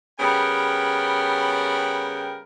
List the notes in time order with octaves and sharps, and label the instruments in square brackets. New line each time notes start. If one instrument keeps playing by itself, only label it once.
[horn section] C#3 G3 B3 A#4 G5 B5